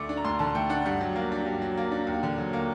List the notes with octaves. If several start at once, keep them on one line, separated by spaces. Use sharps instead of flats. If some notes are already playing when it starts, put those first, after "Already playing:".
Already playing: D2 D3 A3 D6
D4
A#5
D2 C6
D3 A5
A3 G5
D4 F#5
G2 F#5
F#3
A#3
D4
G2
F#3
A#3
D4
D#2
D3
F#3
A#3